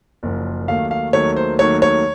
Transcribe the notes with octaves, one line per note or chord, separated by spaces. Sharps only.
F#1 F#2 F3
D#2 D#3 F#3 A3 F5
F5
D#2 D#3 F#3 A3 C#5
C5
D#2 D#3 F#3 A3 C#5
C#5